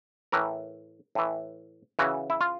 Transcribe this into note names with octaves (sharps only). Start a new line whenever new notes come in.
A2 E3 A#4
A2 E3
C#3 E3 F#4
E4
F4